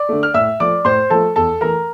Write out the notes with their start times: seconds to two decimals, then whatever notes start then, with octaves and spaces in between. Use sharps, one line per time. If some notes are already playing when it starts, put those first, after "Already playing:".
Already playing: D5 D6
0.09 D3 A3
0.23 F6
0.34 A2 E5 E6
0.60 F3 A3 D5 D6
0.85 A2 C5 C6
1.10 F3 A3 A4 A5
1.36 E2 A4 A5
1.61 E3 A3 A#4 A#5